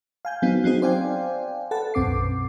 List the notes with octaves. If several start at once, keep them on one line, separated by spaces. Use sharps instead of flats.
F5 G#5 G6
F#3 B3 C4 D#4
F#3 C4 D#4 G#4
C5 D5 F5 G5 G#5
A4 B4 F#5 A5
B1 F#2 C4 D6 C7